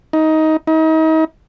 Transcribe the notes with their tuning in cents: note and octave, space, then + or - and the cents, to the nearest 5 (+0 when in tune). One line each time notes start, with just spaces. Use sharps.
D#4 +15
D#4 +35